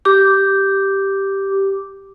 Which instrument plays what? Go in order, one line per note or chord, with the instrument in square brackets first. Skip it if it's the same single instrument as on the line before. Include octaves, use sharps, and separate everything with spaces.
[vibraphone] G4 D6